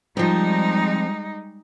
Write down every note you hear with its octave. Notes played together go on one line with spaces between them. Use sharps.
F3 G3 G#3 C4 D#4